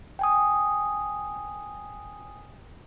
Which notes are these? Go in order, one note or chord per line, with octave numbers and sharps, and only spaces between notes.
G5 G#5 D#6